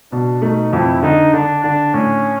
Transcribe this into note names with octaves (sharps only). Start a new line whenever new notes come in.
B2 D4
A3 D#4
F2 E4
D3 D#4
D3 D4
D3 D4
A2 C#4